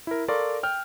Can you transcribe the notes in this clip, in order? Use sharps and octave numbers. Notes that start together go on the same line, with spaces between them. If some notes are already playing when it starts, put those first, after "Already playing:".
E4 A#4
A4 A#4 D5 F5 C6 C#6
G5 F6 G6